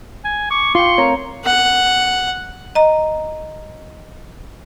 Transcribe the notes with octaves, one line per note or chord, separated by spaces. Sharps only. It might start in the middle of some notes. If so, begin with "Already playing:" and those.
G#5
C#6 D6
F4 F5 G5 C6 C#6
A3 C4 A#4 C#5 A#5
F#5
D#5 A#5